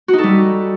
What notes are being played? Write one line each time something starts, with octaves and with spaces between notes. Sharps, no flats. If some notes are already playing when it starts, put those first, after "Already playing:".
F#4
D#4
A4
G3